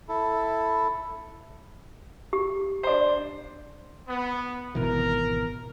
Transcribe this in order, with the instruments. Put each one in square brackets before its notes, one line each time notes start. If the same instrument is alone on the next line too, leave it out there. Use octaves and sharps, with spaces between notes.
[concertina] E4 A4
[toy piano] G4
[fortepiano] D4 C5
[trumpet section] B3
[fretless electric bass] G#1 B2 E3 [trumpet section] A#4